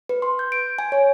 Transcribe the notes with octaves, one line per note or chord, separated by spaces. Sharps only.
B4
C6
G6
D7
G#5
C#5